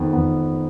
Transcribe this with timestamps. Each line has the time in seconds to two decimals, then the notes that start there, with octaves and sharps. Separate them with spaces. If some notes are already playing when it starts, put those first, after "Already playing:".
Already playing: F2 D#3 B3
0.13 F2 D#3 B3